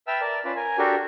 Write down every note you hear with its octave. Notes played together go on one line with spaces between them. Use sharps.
B4 E5 G5 A5 E6 F6
A#4 D5 A5
C#4 F4 B4 D5
A#4 G#5
D4 F#4 G4 A4 A#4